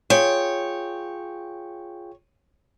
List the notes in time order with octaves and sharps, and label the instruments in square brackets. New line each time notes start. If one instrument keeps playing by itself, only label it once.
[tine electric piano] F4 G#4 G5 [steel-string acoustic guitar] C#5